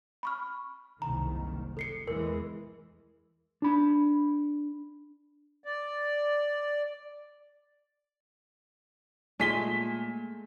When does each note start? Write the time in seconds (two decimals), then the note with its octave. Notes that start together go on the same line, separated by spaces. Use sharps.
0.23 B5 C#6 F6
1.02 F#1 C2 D#3 A#5
1.77 A4 C7 C#7
2.08 E2 E3 G#3 A#4
3.62 D4 B5
5.64 D5
9.40 A#2 G#3 A3 B6 G7